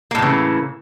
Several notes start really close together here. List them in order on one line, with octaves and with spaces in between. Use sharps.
A#3 A2 E3 C#3